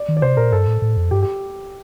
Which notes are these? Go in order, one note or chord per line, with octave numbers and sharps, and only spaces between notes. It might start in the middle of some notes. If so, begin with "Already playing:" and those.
Already playing: D5
D#3
D5
C3 C5
A#2 A#4
G2 A4
A2
A2
F2
G2 G4
G4